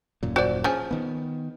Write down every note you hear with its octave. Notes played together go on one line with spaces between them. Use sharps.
D#1 F#2 A#2
F#4 C5 D5
F3 C#4 G#4
D#3 B3